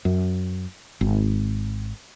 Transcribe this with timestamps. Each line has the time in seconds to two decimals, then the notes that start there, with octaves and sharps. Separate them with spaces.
0.05 F#2
1.01 G#1